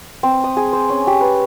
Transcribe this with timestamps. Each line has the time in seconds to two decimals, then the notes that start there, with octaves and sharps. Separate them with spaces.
0.23 C4
0.44 D#6
0.57 G#4
0.73 C5
0.90 C#4
1.07 G4
1.21 B4